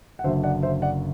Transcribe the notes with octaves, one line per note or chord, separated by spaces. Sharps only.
F#5
F#1 F#2 D3 C5 E5
D5 F#5
C5 E5
D5 F#5